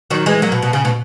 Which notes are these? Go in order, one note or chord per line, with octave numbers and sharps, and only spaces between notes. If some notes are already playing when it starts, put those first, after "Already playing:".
D#3 F#3
E3 G#3
F#3 A#3
B2
B2
C#3
B2